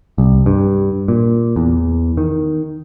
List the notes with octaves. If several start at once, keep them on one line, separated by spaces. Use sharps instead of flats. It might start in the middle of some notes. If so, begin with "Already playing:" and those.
C2
G2
A#2
E2
D#3